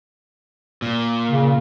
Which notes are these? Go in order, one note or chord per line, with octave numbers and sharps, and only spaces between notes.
A#2
C#3